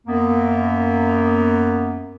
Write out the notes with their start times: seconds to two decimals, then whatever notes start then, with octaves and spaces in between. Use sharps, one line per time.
0.07 F#2 A#3 B3